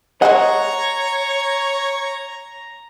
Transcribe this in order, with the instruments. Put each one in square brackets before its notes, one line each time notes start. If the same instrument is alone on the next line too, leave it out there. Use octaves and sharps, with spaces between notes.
[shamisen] G#3 C5 D#5 [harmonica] C#5 [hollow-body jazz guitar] F#5 [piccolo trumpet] A#5